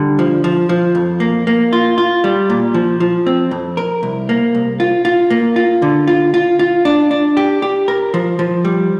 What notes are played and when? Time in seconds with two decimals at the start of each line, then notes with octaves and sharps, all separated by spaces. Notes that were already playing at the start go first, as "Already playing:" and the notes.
Already playing: D3 G3
0.19 F3
0.44 F3
0.69 F3
0.95 F2
1.20 A#3
1.47 A#3
1.73 F4
1.98 F4
2.24 G3
2.50 A#2
2.74 F3
3.00 F3
3.26 C4
3.51 F2
3.77 A#4
4.03 C2
4.29 A#3
4.55 C2
4.80 F4
5.05 F4
5.30 A#3
5.56 F4
5.82 D3
6.08 F4
6.34 F4
6.59 F4
6.85 D4
7.11 D4
7.37 G4
7.62 G4
7.88 A#4
8.14 F3
8.39 F3
8.65 G3